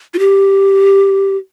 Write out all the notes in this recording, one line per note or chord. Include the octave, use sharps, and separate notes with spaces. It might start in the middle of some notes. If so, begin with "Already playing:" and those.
F4
G4